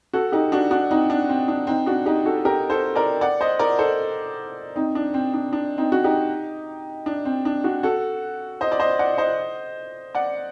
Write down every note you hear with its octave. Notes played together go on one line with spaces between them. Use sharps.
F#4 A4
D#4 G4
D4 F#4
D4 F#4
C4 D#4
D4
C4
D4
C4 D#4
D4 F#4
D#4 G4
F#4 A4
G4 A#4
A4 C5
A#4 D5
D5 F#5
C5 D#5
A#4 D5
A4 C5
C4 D#4
D4
C4
D4
D4
C4 D#4
F#4
D#4 G4
D4
C4
D4
D4 F#4
F#4 A4
C5 D#5
D5
C5 D#5
D5 F#5
C5 D#5
D5 F#5